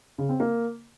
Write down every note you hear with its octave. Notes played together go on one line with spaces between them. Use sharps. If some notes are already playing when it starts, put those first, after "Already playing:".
C#3
C4
A#3